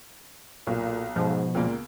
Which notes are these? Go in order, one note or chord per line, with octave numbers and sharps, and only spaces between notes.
B1 A#2
G#2 B2 F3
C#2 A#2 A#3